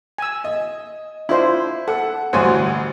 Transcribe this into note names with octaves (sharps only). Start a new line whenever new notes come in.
G#5 E6
D#5
D4 E4 F4 C5
A4 F#5
A1 D2 G2 F#4 C5 C#5 G#5